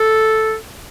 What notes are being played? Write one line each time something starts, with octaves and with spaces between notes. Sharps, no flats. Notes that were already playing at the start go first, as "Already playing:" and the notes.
Already playing: A4